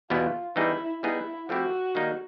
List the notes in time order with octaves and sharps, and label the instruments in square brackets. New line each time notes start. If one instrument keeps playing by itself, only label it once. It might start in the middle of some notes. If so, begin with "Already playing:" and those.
[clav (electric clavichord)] E2 B2 G3 B3 E4 [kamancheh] F4
[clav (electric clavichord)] E3 G3 B3 D#4 G#4 [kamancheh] E4
[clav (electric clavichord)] G3 B3 D#4 G#4 [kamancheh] E4
[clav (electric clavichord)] F3 A3 C4 E4 G4 [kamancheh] F#4
[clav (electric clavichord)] D#3 G3 A#3 D#4